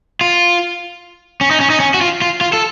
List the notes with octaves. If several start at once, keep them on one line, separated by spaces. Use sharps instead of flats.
F4
C#4
D#4
C#4
D#4
C#4
F#4
F4
F4
F4
A4